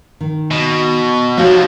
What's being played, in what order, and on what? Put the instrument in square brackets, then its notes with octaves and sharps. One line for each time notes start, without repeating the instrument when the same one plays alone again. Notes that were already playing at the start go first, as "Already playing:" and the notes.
[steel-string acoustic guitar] D#3
[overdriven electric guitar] B2
[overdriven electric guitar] D#2 F3 [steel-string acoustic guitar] F#4 C#5 F5